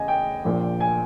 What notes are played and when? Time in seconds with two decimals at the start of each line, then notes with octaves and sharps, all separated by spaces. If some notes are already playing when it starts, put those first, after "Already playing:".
Already playing: E2 C#3 D#5 G#5
0.08 G5
0.44 A#1 A#2 F3
0.80 G#5